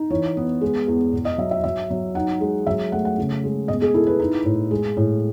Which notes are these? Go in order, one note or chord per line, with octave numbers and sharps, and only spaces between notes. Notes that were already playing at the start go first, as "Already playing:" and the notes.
Already playing: D#4
E3 C#5
B3
G#3
E2
B2
D#5
F#3 E5
E5
F#3 E5
F#3
D#4 F#5
G#3
F#3 E5
A3 F#5
F#5
C#3
G#3
B2 D#5
G#4
E4 A4
B4
D#4
A2
G#3
A2